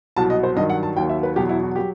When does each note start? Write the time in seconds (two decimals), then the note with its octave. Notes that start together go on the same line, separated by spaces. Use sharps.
0.16 C2 B2 F#3 A5
0.30 D#5
0.43 C5
0.56 G2 D#3 F#3 D#5
0.70 F#5
0.83 A5
0.96 D#2 D#3 F#3 G5
1.09 E5
1.23 B4
1.36 E2 B2 F#3 G4
1.49 E4
1.63 F#4
1.76 F#3 G4